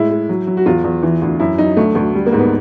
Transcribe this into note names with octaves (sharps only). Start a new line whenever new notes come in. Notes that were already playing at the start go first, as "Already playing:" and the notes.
Already playing: A2 G#3 E4
G#3
F#3
F#3
F#4
E2 F4
E2
E3
D2
F#2 E4
F#3 D#4
D2 A3
D2 A3
G3
A#3
G#2
B3